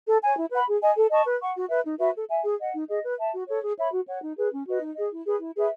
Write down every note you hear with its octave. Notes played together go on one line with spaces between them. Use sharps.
A4
C#5 G#5
E4
B4 F#5 B5
G#4
D#5 G#5
A4
D#5 A5 C#6
B4
F#5 C#6
F#4
B4 E5
D#4
F#4 B4 E5
A4
E5 G#5
G#4
D#5 F#5
D#4
G#4 D#5
B4
E5 A5
F#4
A4 C#5
G#4
C#5 E5 B5
F#4
C#5 F#5
D#4
G#4 B4
C#4
F#4 B4 D#5
D#4
G#4 D#5
E4
G#4 B4
E4
G#4 B4 E5